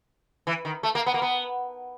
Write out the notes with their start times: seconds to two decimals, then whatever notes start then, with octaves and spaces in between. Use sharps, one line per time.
0.47 E3
0.65 D#3
0.83 A3
0.95 A#3
1.06 B3
1.14 A#3
1.22 B3